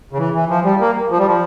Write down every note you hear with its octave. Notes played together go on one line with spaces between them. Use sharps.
C#3
E3
E3
F3
G3
A#3
F3
G3
F3